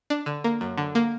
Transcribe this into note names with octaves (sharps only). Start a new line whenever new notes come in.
D4
D3
A#3
F#2
D3
A#3